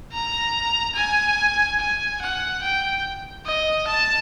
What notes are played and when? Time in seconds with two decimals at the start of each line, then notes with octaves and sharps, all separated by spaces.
0.13 A#5
0.95 G#5
1.79 G#5
2.22 F#5
2.63 G5
3.46 D#5
3.87 A5